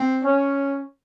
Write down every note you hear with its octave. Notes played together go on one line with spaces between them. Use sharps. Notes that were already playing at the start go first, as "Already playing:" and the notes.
Already playing: C4
C#4